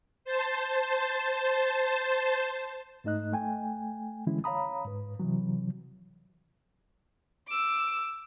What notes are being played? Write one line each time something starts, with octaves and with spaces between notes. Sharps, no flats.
C5 A5
G#2 A3 D#4 D#5 F#6
A3 G5 G#5
D3 E3 G#3 C#4 E4
C#5 F5 A#5 B5 D#6
G#2 B4
C3 E3 F#3
D6 E6